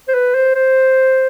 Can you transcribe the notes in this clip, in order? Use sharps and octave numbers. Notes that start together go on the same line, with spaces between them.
C5
B4
C5
C5